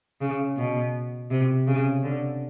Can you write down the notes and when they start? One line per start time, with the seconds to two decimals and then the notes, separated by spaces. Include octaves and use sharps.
0.21 C#3
0.58 B2
1.31 C3
1.67 C#3
2.03 D3